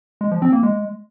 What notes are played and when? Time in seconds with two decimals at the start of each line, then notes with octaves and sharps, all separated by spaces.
0.21 G#3
0.31 F3
0.42 C4
0.53 A#3
0.63 G#3